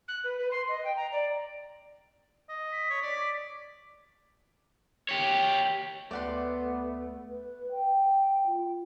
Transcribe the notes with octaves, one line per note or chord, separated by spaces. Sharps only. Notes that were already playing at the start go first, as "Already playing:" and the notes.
F#6
B4
B4
C6
D#5
G5
A#5
D5
D#5
B6
C#5
D5
G4 C#5
D2 A3 B3 D5 F#5 C6
B4
G5
F4